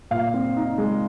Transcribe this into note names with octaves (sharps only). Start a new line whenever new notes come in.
A#2 F5
C4
D#4
G#3